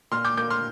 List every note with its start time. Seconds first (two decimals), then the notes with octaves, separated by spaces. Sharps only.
0.11 A#2 C6 F6
0.25 D6 G6
0.37 A#3 D6 G6
0.50 C6 F6